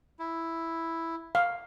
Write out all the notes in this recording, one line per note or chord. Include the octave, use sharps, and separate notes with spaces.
E4
F5